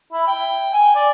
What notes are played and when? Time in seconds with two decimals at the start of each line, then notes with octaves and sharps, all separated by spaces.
0.12 E4
0.27 G5
0.73 G#5
0.95 D5